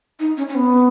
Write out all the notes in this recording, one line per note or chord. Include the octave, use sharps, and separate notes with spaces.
D#4
C#4
C#4
B3